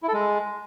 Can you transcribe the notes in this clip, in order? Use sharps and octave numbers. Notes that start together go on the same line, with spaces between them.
E4
A4
G#3